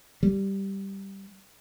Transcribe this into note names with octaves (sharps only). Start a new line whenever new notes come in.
G3